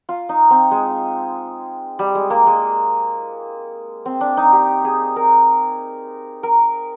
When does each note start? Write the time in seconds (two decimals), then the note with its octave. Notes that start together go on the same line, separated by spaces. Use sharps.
0.09 F4
0.29 D#4
0.50 C4
0.71 G#3
1.99 G3
2.15 G#3
2.30 A#3
2.47 G#3
4.06 C4
4.21 D4
4.37 D#4
4.52 G4
4.85 G#4
5.16 A#4
6.43 A#4